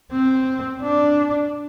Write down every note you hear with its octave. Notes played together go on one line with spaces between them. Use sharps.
C4
D4